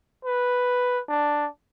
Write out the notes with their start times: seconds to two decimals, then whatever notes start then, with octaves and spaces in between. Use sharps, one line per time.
0.25 B4
1.09 D4